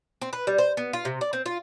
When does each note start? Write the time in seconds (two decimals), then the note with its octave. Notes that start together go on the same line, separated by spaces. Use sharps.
0.21 C4
0.33 B4
0.47 G3
0.58 C5
0.77 B3
0.93 F4
1.05 C3
1.21 D5
1.33 C4
1.46 F4